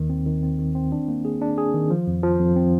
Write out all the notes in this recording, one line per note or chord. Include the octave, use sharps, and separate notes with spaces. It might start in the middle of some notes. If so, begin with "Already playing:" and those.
Already playing: D#2 D#3
C4
D#3
C4
D#3
C4
D4
A#3
G#4
D4
G#4
D#3
F3
F2
F3
F2
C4